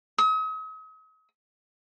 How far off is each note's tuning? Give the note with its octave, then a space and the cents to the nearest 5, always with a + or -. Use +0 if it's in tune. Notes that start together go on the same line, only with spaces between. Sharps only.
D#6 +45